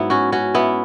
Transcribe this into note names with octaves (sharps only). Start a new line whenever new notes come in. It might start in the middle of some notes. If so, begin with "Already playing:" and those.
Already playing: G#2 F#3 B3 E4
C#4 F#4
C#4 F#4
B3 E4